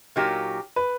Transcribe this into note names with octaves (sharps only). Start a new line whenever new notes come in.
A#2 F#3 A#3 D#4 G4
B4